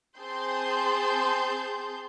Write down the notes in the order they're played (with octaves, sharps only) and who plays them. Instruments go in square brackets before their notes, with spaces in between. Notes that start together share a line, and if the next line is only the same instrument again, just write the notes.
[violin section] C4 G#4 A5 C6 G6